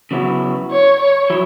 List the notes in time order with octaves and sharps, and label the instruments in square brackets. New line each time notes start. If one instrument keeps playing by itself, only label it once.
[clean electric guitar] C#3 F#3 B3 E4
[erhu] C#5
C#5
[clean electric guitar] F#3 E4